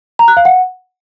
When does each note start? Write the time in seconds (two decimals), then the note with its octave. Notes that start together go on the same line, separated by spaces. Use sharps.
0.19 A#5
0.28 F#6
0.37 F5
0.45 F#5